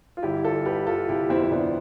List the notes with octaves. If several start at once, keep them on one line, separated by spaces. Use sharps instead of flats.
F4
G1 E4 G4
G1 F4 A4
G1 G4 B4
G1 F4 A4
C3 E4 G4
F2 C4 E4
C4
C3 B3 D4